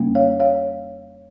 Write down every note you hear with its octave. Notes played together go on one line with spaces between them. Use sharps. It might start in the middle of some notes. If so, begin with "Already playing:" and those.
Already playing: F2 C#3 G3 A#3 C#4
C#5 F5
C#5 F5